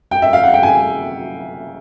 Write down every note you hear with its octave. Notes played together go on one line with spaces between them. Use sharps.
G5
E5
F5
F#5
G5
G#5